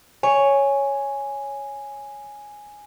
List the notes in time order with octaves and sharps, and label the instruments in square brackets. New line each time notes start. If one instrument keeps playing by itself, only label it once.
[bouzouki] C#5 [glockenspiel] G#5